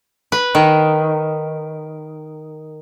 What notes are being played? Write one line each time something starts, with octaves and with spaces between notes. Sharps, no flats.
B4
D#3